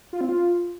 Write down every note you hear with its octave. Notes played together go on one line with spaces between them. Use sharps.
F4
C4
F4